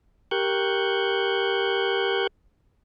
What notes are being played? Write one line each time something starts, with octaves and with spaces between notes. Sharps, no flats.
G4 A#4 C#6 F#6 G6